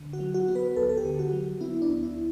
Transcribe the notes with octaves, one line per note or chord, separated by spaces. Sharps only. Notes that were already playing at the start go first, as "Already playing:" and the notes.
Already playing: D3
F#4
F#3
F#4
B3
B4
D2 A4
A4
G4
D3
F#4
F#3
B3 E4
D4
D2
E4